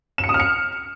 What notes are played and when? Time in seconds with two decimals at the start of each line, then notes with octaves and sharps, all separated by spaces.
0.18 E7
0.24 C#7
0.29 D#6
0.34 F6
0.40 C#7